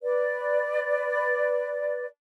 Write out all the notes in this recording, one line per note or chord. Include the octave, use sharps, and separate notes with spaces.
B4 D5